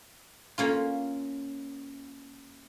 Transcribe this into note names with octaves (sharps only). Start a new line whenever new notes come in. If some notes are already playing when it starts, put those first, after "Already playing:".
A#3 C#4 F4